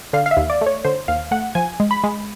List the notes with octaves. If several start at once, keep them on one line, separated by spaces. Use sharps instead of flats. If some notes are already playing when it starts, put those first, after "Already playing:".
D3 F5
F5
E5
D#2
D5
A3
C#5
D3 C5
D#2 F5
A3 F#5
F3 G#5
G#3
B5
G#3